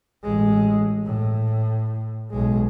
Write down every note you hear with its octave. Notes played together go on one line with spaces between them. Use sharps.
A1 G#3
A2
B1 G#3